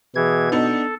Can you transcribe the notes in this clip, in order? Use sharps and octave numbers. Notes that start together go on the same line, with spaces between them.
B2 E3 G#4 G#6
B3 D4 D#4 A4